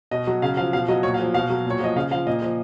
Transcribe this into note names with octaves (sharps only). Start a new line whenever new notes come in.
B2 D#5
F#3
C#3 F5
F3 F5
B2 F5
F#3 D#5
A#2 C#5
F5
F3
B2 F5
F#3
A#2 C#5
F3 D#5
C#3 F5
F3 F5
A#2 D#5
F3